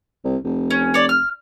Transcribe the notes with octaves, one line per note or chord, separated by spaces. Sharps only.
C2
F1
C#4
C#5 D5
F6